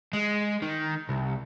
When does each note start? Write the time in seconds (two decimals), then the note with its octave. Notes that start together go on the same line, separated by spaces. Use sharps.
0.13 G#3
0.62 D#3
1.09 C2